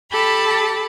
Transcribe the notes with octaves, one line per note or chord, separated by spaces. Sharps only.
G4 A4 A5 B5